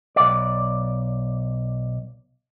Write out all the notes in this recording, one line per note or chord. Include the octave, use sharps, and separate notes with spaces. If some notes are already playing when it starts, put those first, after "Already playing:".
B1 D5